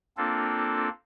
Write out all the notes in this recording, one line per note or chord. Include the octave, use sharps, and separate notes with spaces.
A#3 C4 D4 F4 A4